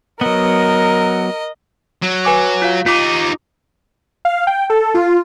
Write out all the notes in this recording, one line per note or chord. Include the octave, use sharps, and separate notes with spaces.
F#3 B3 A#4 D#5
F#3
B4 G#5 D6
F4 F5
D#4 F4 G4 D6
F5
G5
A4
F4